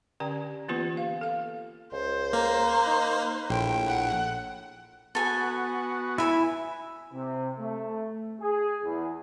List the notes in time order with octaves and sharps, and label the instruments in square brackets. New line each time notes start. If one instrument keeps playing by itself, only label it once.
[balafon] D3 C#4 G4 D5 G5
E3 A#3 B3 F4 G4 B4
F5
A4 F5
[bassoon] C#2 [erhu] C5
[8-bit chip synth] A#3 [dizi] A#5
[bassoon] D#4
[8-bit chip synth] A#1 [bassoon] A2 [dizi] G5
[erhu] F#5
[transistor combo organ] B3 F#4 [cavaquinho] A4 G#5
[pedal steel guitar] E4 [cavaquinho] G#5 B5
[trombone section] C3
A3
G#4
E2